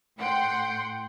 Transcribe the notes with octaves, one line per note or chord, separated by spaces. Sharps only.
A2 F#5 G5 C6